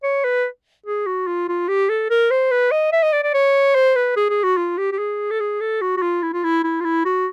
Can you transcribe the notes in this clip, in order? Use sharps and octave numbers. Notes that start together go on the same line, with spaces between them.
C#5
B4
G#4
F#4
F4
F4
G4
A4
A#4
C5
B4
D#5
E5
D#5
D5
D5
C#5
C5
B4
G#4
G#4
F#4
F4
G4
G4
G#4
A4
G#4
A4
F#4
F#4
F4
E4
F4
E4
E4
F4
E4
F#4